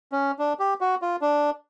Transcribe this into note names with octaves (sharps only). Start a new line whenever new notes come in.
C#4
D4
G4
F#4
F4
D4